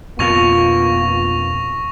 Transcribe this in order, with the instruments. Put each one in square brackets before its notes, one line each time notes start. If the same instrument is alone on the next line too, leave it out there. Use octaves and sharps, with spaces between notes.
[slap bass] F2 B2 [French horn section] A#3 B3 F4 [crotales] C#6 A#6 F7